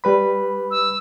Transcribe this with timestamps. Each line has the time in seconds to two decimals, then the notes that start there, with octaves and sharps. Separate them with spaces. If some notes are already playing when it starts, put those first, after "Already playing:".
0.04 G3 B4 B5
0.71 E6